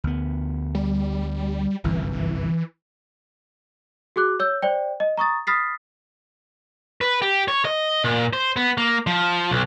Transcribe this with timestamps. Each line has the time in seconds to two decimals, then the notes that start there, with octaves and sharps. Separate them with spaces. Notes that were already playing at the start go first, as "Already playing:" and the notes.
0.04 D2 B3
0.75 G3
1.84 G1 C2 F#2 E3
4.16 F#4 G#4 D6 F#6
4.40 C#5 E6 G6
4.62 C5 D5 G5
5.00 D#5
5.17 A#5 C#6 D#6 A6
5.47 B5 D#6 F6 A6 B6 C7
7.01 B4
7.22 G4
7.48 C#5
7.65 D#5
8.04 A#2
8.33 C5
8.56 B3
8.78 A#3
9.07 F3
9.51 B1